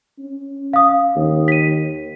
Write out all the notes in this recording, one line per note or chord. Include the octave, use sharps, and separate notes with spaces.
C#4
F5 D#6
D#2
B6 D#7